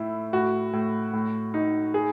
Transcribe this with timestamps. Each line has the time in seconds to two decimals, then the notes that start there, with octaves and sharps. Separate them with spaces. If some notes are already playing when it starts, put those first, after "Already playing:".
Already playing: A2 E4
0.33 A2 F#4
0.73 A2
1.13 A2
1.54 D#4
1.94 G#4